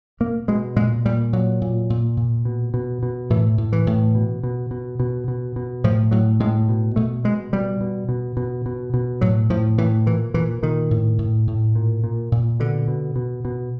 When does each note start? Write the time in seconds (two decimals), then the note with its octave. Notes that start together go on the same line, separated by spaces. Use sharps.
0.20 B2 A#3
0.48 B2 G#3
0.76 A#2 G#3
1.05 A#2 G3
1.33 A#2 F#3
1.61 A#2
1.90 A#2
2.17 A#2
2.45 B2
2.74 B2
3.03 B2
3.30 A2 E3
3.58 A2
3.73 E3
3.87 A2
4.15 B2
4.43 B2
4.71 B2
5.00 B2
5.28 B2
5.56 B2
5.84 A2 F3
6.11 A2 F#3
6.40 A2 G#3
6.69 B2
6.96 B2 A3
7.24 B2 G#3
7.53 B2 G3
7.81 B2
8.09 B2
8.37 B2
8.66 B2
8.94 B2
9.21 A2 F#3
9.50 A2 F3
9.78 A2 E3
10.06 A#2 E3
10.34 A#2 E3
10.63 A#2 D#3
10.91 A2
11.18 A2
11.47 A2
11.75 A#2
12.04 A#2
12.32 A#2
12.60 B2 D3
12.88 B2
13.16 B2
13.45 B2